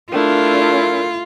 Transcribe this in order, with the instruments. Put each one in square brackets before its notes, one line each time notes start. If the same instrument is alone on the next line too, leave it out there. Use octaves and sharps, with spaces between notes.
[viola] A3 E4 [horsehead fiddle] D4 [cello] F4 [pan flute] A#4